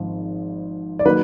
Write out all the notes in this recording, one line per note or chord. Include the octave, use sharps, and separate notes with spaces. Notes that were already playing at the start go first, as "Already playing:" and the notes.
Already playing: G#1 G#2 F3
D5
D#3 F#3 A#3 B4